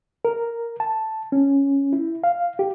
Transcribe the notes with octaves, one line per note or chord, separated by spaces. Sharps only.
A#4
A5
C#4
E4
F5
G4